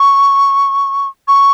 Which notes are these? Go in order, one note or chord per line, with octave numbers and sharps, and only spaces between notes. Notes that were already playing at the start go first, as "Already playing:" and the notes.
Already playing: C#6
C#6